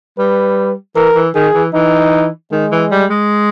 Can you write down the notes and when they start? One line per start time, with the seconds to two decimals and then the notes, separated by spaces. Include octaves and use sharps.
0.18 G3 B4
0.96 E3 A#4
1.15 E3
1.35 D#3 G#4
1.55 E3
1.74 E3 D#4
2.52 D#3 G#3
2.72 E3
2.92 G3
3.11 G#3